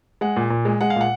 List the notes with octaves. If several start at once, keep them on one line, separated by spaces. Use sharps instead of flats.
G#3 F#5
A#2
A#2
G#3
G#3 F#5
F5
A#2 F#5